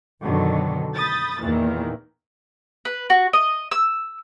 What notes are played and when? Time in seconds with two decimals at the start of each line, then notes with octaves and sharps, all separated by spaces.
0.22 F#2 B2 D3 D#3 F#3
0.95 B5 D#6 G6 A6
1.40 E2 A#2 D#3 E3
2.85 B4
3.10 F#4
3.33 D#5
3.71 E6